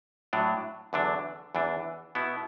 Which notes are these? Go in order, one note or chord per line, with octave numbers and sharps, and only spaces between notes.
A2 F#3 D4
E2 D3 F#3 D4
E2 E3 D4
B2 B3 E4